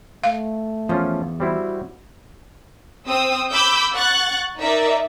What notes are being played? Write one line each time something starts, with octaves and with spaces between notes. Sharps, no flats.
A3 F5
E2 F3 C#4 F4
G3 C4 E4 F#4
C4 D#6 E6
B5 D6 E6 G6
F#5 C#6 F#6 A6
D#4 A#4 D5 E5